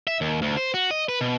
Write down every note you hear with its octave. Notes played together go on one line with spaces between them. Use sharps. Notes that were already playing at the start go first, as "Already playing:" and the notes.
E5
D#2
D2
C5
F#4
D#5
B4
B2